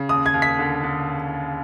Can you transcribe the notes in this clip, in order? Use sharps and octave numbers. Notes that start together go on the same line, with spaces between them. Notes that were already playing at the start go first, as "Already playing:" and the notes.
Already playing: C#3
D#2 D#6
G#6
D#2
B6
D3
D3